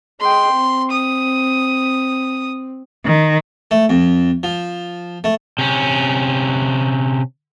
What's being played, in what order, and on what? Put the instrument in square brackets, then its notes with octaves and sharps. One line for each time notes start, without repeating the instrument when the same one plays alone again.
[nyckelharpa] G#3 G5 [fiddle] C6
[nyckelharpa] C4
[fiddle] D#6
[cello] D#3
[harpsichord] A3
F2
F3
A3
[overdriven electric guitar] C3 C#4